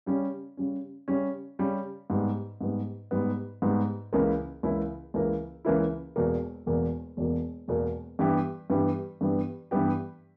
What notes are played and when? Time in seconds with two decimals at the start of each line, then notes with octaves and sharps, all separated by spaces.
0.06 C#3 G3 C#4
0.57 C#3 G3 C#4
1.08 C#3 G3 C#4
1.59 C#3 G3 C#4
2.10 G#2 G3 B3
2.61 G#2 G3 B3
3.11 G#2 G3 B3
3.62 G#2 G3 B3
4.13 C#2 C#3 E3 A#3 E4
4.63 C#2 C#3 E3 A#3 E4
5.14 C#2 C#3 E3 A#3 E4
5.65 C#2 C#3 E3 A#3 E4
6.16 E1 E2 B2 A#3
6.66 E1 E2 B2 A#3
7.17 E1 E2 B2 A#3
7.68 E1 E2 B2 A#3
8.19 G2 E3 G3 B3 G4
8.70 G2 E3 G3 B3 G4
9.21 G2 E3 G3 B3 G4
9.71 G2 E3 G3 B3 G4